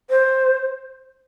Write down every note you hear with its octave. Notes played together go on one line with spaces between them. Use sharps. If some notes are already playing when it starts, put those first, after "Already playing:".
C5